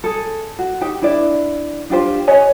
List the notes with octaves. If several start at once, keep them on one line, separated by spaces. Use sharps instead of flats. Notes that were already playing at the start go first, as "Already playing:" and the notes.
G#4 A4
F#4
D#4 G4 C5 G5
D4 E4 B4 D5
D4 F4 G4 C5
B4 C#5 D#5 G#5